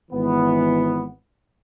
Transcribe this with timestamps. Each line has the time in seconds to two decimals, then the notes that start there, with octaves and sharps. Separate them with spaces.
0.12 G#1 E3 B3